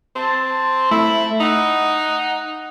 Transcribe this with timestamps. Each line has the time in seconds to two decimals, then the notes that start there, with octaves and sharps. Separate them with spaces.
0.16 C4 A5
0.91 A3 E4
1.40 D#4 F#5